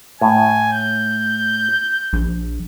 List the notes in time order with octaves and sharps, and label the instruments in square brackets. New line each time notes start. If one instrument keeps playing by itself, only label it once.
[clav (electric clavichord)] A2 [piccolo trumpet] G#5
[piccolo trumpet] G6
[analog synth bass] A#1